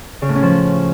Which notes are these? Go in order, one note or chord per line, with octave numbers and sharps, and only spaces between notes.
C#3
A2
C#4
F3